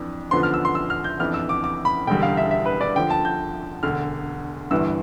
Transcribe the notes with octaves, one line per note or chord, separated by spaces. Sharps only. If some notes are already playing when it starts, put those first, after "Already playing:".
Already playing: F2 E3 D4
E2 D3 F3 B3 D4 C6
F6
E6
C6
E6
F6
G6
F2 E3 B3 D4 F6
E6
D6
D6
B5
E1 E2 D3 G3 G5
F5
E5
E5
B4
D5
D2 D3 F3 G5
A5
G6
E1 D2 D3 F6
G1 G2 E3 E6